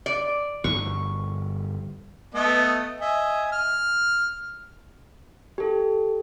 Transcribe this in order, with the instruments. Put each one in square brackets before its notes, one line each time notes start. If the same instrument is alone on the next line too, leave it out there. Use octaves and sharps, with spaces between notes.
[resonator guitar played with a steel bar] D5
[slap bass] G1 F3 [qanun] C#6
[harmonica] A3 B3 D#5
D#5 E5 G#5
F6
[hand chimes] G4 A4